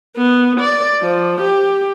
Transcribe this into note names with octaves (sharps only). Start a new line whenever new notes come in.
B3
D5
F3
G4